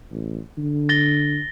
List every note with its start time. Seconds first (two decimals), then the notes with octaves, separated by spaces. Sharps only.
0.11 A1
0.57 D3
0.89 A6 A#6 G7